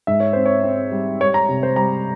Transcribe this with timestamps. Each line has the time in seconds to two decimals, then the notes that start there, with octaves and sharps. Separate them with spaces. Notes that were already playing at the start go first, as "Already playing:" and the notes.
0.07 G#2 E5
0.20 C#5
0.33 C4 C5
0.46 C#5
0.63 C4
0.92 G3
1.21 G3 C#5
1.34 A#5
1.49 C3
1.63 C5
1.76 G3 A#5